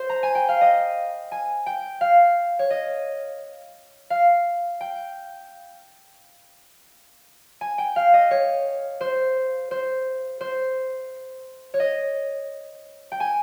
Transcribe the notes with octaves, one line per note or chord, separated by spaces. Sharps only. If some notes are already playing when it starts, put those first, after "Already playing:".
Already playing: C5
A#5
G#5
G5
F5
D#5
G#5
G5
F5
C#5
D#5
F5
G5
G#5
G5
F5
D#5
C#5
C5
C5
C5
C#5
D#5
G5
G#5